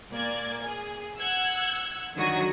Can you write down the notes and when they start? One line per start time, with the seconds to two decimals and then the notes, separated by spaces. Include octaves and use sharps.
0.10 A#2 A#3 D5 G#6
0.64 G#4
1.19 F#5 E6 F#6 G#6
2.15 D3 D#3 F#3 F#4 D#6 G#6